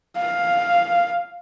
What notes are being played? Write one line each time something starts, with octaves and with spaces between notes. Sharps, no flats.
F5